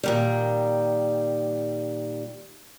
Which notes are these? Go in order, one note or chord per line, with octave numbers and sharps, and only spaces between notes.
A#2 D#3 G3